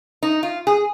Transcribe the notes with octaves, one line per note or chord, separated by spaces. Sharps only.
D#4
F4
G#4